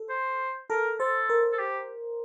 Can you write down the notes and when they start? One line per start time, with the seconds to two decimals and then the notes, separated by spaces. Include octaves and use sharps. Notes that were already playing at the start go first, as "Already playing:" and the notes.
Already playing: A4
0.09 C5
0.70 A4 A#4
1.00 A4 C5
1.30 A#4
1.52 A4
1.59 G4